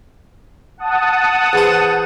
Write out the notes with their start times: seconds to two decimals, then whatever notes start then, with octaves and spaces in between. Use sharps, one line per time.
0.78 F#5 A5 D#6
1.53 E2 C5